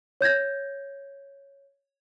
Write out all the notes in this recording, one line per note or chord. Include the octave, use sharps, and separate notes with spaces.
C#5 G6 G#6 A#6